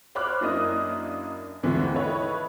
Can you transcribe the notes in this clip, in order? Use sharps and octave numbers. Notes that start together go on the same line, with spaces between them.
C5 C#5 B5 D6 F6 F#6
F#2 A#3 D4 E4 D#5 D#6
D#2 G#2 D3 E3 F3 A3
E4 A4 B4 C#5 D#5